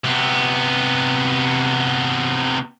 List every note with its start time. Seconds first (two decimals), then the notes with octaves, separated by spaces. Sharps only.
0.04 C3 B3